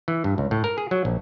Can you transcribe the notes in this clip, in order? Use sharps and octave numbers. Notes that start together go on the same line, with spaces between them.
E3
G2
C#2
A2
A#4
G#4
F#3
A#1